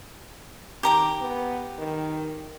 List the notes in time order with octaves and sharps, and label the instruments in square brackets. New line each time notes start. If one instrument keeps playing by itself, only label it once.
[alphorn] D#3 [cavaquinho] G4 A#5 D6
[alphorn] B3
D#3